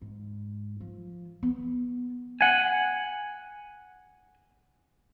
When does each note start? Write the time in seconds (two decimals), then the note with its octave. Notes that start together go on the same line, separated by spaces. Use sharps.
0.01 G#2
0.80 F3
1.43 B3
2.41 F#5 G#5